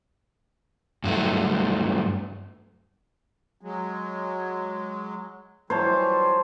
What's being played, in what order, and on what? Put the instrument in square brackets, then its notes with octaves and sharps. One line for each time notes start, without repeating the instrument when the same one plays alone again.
[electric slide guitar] G2 F#3 A3
[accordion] F#3 G#3
[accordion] E3 F#3 G3 [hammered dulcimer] C5 C#5 A5